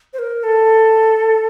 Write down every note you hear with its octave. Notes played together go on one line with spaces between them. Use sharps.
C5
A#4
A4